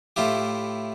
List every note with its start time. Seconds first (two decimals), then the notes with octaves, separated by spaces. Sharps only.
0.16 A2 E4 F4 G4